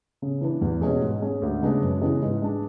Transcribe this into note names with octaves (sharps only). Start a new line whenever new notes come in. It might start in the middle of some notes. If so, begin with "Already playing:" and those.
C#3
E3 B3 D4
E2
B2 G#3 C#4 G#4
G#2
G#3 C#4
D2
C#3 G#3 B3 D4
F#2
C#3 E3 G#3 B3
G#2
G#3 D4